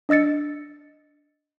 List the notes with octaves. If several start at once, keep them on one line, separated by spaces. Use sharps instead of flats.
D4 D#5 E6 A6 C#7